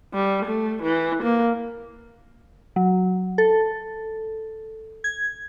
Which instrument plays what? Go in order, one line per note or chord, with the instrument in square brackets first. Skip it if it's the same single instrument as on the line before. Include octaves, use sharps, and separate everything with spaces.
[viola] G3
A3
E3
A#3
[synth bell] F#3
A4
G#6